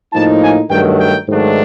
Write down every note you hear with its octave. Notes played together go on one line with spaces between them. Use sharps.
A2 F3 A#3 D#4 A5
G#5
G2 D#3 F#3 A3 G5
G5
G#2 D#3 F#3 A3 D4